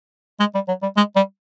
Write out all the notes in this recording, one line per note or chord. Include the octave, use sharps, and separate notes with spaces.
G#3
G3
F#3
G3
G#3
G3